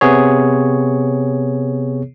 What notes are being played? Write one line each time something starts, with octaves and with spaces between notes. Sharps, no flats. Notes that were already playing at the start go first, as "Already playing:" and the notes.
C3 B3 G#4 C#5